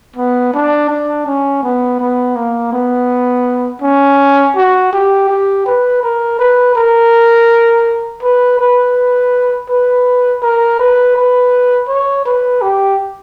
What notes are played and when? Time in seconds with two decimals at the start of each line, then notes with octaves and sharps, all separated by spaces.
0.16 B3
0.53 D4
0.90 D4
1.26 C#4
1.63 B3
2.00 B3
2.36 A#3
2.73 B3
3.82 C#4
4.56 F#4
4.93 G4
5.29 G4
5.66 B4
6.03 A#4
6.39 B4
6.76 A#4
8.23 B4
8.59 B4
9.69 B4
10.42 A#4
10.79 B4
11.16 B4
11.89 C#5
12.26 B4
12.62 G4